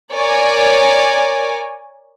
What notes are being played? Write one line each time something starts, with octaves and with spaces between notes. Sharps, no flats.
A#4 C#5 D5 G#5